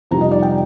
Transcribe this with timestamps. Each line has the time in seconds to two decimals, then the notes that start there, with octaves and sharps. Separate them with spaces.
0.11 F2 C3 D#3 G3 A#5
0.21 D#5
0.31 D5
0.42 G5